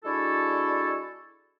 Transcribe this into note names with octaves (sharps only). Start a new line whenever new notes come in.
G#3 D4 E4 F#4 A4